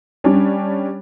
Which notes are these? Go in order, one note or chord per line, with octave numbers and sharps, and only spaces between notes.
G3 C#4 D4